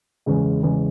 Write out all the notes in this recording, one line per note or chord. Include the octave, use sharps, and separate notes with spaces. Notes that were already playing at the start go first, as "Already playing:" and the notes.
E2 C#3 G#3
E2 C#3 G#3